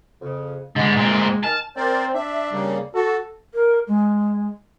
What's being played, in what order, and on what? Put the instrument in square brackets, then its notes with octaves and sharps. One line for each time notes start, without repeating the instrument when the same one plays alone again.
[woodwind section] F2 C#3
[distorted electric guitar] D3 B3 [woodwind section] G#3
[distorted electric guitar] A#2 C4
[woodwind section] D#3 G#5 F6 [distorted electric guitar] A5
[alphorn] C4 [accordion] A#4 C5 D5
[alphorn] D4 [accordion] E5
[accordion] C#3 G3 A#3
[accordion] F#4 [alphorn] A4
[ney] A#4
G#3